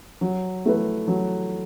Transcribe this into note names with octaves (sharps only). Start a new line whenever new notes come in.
F#3
A3 E4 B4
F#3